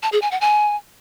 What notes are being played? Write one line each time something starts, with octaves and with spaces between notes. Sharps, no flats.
A5
G#4
G#5
F#5
G#5